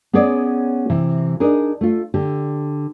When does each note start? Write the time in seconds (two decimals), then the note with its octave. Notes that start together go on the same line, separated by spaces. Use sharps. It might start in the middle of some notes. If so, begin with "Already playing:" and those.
0.13 B3 C#4 G#4 C#5 D5
0.90 C3 E3
1.40 D4 D#4 G#4 A#4
1.81 A3 F4
2.14 D3 G4